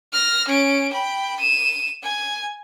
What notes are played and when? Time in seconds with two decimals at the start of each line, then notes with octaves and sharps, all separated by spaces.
0.13 F6 A#6
0.48 C#4 D7
0.92 G5 B5
1.39 D#7 E7
2.02 G#5